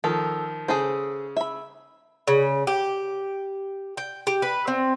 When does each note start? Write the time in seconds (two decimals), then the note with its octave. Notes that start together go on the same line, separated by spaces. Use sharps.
0.04 D#3 F3 A4
0.68 C#3 G#4 A4 C5
1.37 E5 B5
2.27 C#3
2.67 G4
3.97 G5
4.27 G4
4.42 B4
4.68 C4